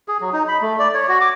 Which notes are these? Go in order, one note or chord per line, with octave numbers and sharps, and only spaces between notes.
G#4
F#3
D#4
B5
A3
D5
C#5
F#4
D6